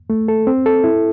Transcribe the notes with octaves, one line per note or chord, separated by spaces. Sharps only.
A3
A4
C4
A4
E4